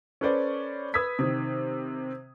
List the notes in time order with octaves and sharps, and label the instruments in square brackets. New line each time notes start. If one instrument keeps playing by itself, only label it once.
[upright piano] C#4 A4 B4 C5 D5
B4 D#6 E6 G#6 B6
C3 D#3